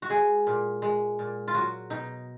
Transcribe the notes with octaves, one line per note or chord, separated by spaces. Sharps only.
F#4
G#3 G#4
A#2
G#3
A#2
F4
F#3 F#4
B2 D#4